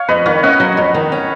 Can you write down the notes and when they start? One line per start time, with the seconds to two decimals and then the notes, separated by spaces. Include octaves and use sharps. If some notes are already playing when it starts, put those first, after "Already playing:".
Already playing: C#5 F5
0.08 F2 B4 D#5
0.26 D#3 C#5 F5
0.43 C#4 D#5 F#5
0.60 F#3
0.77 F2
0.94 D#3
1.12 C#4